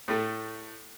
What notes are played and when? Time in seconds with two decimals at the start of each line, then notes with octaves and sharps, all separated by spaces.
0.08 A2 A3